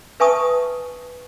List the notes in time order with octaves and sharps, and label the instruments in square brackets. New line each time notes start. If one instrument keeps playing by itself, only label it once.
[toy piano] B4 E5 G#5 A5 C#6 D#6